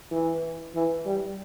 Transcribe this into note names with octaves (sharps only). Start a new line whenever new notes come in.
E3
E3
G3